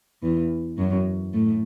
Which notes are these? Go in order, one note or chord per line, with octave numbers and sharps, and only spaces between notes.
E2 E3
F#2 F#3
A2 A3